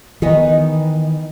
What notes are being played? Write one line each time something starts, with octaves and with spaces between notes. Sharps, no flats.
D#3 E3 B3 D#4 D#5